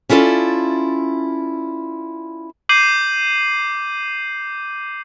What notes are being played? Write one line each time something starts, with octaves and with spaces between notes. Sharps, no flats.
C#4 E4 F4 A4 D5
D6 G6 C7 D#7 F#7